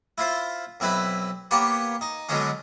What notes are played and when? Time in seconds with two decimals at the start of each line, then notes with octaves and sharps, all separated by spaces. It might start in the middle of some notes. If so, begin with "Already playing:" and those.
0.18 E4 F4 C5
0.80 B1 C4 E4 B4 B5
1.51 A#3 B3 G4 C#5
2.01 D#4
2.29 B2 D3 F#3 G#3 C#4